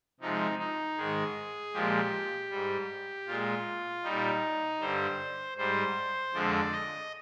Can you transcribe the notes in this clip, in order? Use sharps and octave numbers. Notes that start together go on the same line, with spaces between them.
C3 F3 G#3 D#4
D#4
G#2 D#3 G#3 G#4
A#2 F3 G#3 G4
G#2 G3
A#2 G#3 F4
A#2 G3 D#4
G2 D3 G3 C5
G#2 G3 C5
F2 D3 F3 G#3 D5
D#5